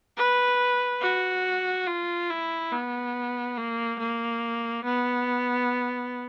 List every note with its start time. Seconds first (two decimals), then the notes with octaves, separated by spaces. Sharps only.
0.17 B4
1.01 F#4
1.87 F4
2.29 E4
2.72 B3
3.57 A#3
3.99 A#3
4.84 B3